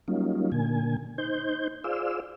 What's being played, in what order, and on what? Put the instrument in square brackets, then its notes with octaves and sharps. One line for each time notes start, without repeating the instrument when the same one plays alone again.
[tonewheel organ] F#3 G3 A#3 C#4 D#4 F4
A#2 D3 A#3 G#5
D#4 C5 G6
F4 G#4 C5 D5 F5 E6